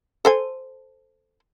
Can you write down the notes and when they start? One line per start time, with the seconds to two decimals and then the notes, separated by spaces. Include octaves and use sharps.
0.25 A4 C5 G#5